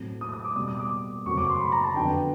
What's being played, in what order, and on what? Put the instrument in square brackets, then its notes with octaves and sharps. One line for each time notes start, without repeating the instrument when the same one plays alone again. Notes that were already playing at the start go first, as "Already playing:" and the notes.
Already playing: [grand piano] A2 F#3 A3 C4
D#6
D#6
D6
B2 G3 C4 D#6
D#6
D6
F#2 C#3 F#3 A3 C4 C#6
D6
C6
B5
A#5
A5
F2 D3 F#3 B3 G5